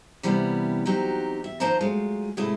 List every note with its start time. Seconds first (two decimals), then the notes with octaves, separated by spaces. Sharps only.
0.23 C3 E3 G3 B3 C#4
0.86 F#3 C4 D#4 F#4 G4
1.44 E5
1.60 D#3 F3 C5 D#5 A5 A#5
1.81 F#3 G#3 A3 F4
2.37 A2 C3 G#3 A3 E4